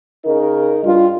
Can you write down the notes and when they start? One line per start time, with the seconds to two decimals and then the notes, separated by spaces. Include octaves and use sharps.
0.25 C#3 D#4 A#4
0.83 G2 F4